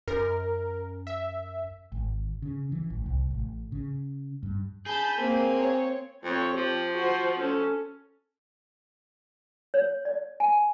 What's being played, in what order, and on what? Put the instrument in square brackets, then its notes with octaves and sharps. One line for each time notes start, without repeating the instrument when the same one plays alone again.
[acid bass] F#2 [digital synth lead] A#4
[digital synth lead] E5
[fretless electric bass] G#1
C#3
E3
A1
C2
A1
C#3
G2
[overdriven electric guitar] G#4 [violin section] A5 B5 G6
[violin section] A#3 [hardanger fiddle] C4
[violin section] C#5
[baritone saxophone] F2 [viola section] C4 C#5
[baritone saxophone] F3 [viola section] G4
[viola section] F#4 C5
C#4 A4
[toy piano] C#5
D5
G#5